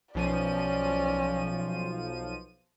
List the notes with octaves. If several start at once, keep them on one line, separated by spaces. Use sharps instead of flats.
B1 F3 C#4 D5 D#7